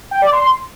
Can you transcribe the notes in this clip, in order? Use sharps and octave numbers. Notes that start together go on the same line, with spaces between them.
G5
D5
C6